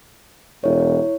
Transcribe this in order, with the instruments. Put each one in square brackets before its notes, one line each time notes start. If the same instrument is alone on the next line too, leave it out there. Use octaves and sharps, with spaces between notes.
[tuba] E1 [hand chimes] E4 C#5